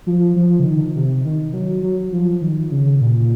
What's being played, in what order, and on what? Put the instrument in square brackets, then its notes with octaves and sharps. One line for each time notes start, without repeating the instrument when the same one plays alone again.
[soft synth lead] F3
F3
C#3
D#3
C3
D#3
F#3
F#3
F3
D#3
C#3
A#2